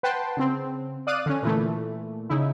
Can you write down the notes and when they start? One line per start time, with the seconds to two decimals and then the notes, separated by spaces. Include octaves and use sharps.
0.03 B4 F#5 G5 A5 C6
0.37 C#3 C4
1.07 D5 F5 D#6 F#6 D#7
1.26 D3 C#4
1.43 A#2 E3 A3
2.29 C#3 D#4 E4